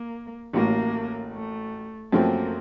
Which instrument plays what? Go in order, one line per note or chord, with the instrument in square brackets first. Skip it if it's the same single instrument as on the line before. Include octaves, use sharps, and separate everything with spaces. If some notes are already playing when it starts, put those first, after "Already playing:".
Already playing: [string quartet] A#3
[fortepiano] A1 A2 F#3 [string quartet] A#3
[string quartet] A3
[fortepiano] F#2 F3 A3 C4 [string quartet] A#3